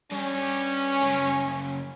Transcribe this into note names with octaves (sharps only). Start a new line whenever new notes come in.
G2 G3 C#4
F#2 C#3